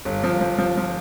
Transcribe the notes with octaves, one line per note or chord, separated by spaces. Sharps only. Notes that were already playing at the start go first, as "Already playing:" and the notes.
G1
F3
F3
F3
F3